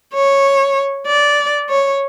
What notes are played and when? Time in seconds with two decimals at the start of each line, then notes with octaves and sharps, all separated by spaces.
0.14 C#5
1.07 D5
1.69 C#5